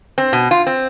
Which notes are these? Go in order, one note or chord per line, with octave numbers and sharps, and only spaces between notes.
C4
B2
F4
C4